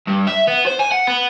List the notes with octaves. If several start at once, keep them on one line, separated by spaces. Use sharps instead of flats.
G2
E5
B3
C5
G#5
F#5
B3